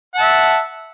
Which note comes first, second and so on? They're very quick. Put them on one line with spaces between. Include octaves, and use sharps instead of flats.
F#5 A5 E5